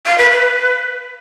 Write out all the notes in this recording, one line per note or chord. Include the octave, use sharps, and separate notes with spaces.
F5
B4
B4